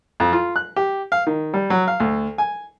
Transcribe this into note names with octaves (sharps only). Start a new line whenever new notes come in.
F2
F4
F#6
G4
F5
D#3
G3
F#3
F5
D2
G#5